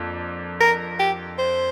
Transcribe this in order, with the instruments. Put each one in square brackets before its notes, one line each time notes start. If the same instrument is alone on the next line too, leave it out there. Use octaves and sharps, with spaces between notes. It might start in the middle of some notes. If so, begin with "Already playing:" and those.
Already playing: [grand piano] F2 A#3 D4
[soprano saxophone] A#4
G4
C5